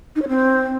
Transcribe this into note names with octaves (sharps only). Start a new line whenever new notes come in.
D#4
C#5
C4